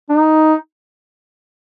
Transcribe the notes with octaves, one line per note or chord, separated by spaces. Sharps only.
D4
D#4